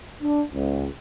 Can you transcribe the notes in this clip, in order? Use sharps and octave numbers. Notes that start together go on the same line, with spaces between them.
D4
C#2